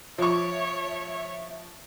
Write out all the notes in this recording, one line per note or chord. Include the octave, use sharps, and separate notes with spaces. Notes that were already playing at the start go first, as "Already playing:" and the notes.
F3 C#5 E5 C#6